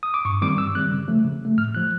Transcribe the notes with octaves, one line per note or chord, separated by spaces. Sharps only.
D#6
D6
G2 C#6
D#3 G3 C4 D6
G2 E6
D#3 G3 C4 F#6
C#3
F3 A3
C#3
F3 A3
A2 F6
F3 A3 F#6